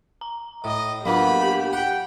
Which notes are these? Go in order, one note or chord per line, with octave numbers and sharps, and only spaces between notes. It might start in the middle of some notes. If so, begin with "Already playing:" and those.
A#5
A2 D#5
F#3 A#3 B3 D4 F4 G4 B5
F#5 G5